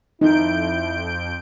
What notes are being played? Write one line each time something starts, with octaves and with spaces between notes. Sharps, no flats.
F2 D#4 E4 G6 D7